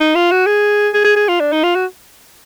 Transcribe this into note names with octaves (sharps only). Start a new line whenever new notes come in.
D#4
F4
F#4
G#4
G#4
G#4
G#4
F4
D4
D#4
F4
F#4